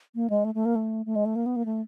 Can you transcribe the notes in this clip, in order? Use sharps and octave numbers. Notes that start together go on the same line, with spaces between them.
A#3
G#3
A3
A3
A#3
A3
A3
G#3
A3
A#3
B3
A#3
A3